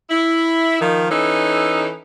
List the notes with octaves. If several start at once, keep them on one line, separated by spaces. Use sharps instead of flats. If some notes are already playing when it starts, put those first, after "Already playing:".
E4
D#3 F3
E3 C#4 D#4 A4